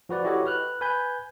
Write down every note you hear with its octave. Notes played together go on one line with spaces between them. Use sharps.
F3 F#4 B4 D5
E4 F#4 G4 A4 C#5 D#5
B4 F6 F#6
B4 G#5 B5 G6